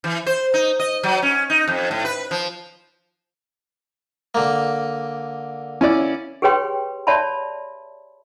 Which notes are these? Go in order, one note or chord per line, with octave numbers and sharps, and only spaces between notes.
E3
C5
D#4
D#5
F#3
C#4
D#4
F2
A2
B4
F3
D3 A#3
C#4 E4 D5
G4 G#4 B4 C#5 G5 C6
C#5 D5 E5 A5 B5 C6